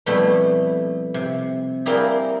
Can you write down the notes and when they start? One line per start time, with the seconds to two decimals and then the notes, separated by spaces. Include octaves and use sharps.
0.06 F2 B2 G3 A3 E4
1.14 C3
1.86 G3 A#3 C4 E4 G4 G#4